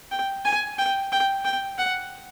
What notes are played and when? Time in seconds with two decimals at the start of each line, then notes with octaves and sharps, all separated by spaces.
0.12 G5
0.45 G#5
0.79 G5
1.12 G5
1.45 G5
1.78 F#5